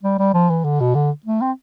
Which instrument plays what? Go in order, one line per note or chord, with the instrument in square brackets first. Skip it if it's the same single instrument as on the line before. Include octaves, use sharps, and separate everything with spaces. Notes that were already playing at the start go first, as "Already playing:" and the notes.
[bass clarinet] G3
G3
F3
E3
D3
B2
D3
A3
C4